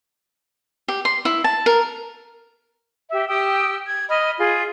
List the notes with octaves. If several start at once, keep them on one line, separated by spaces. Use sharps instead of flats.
G4
C6
E4
A5
A#4
G4 E5
G4 G5 D#6 E6
G#6
D#5 B5 F6
F4 G#4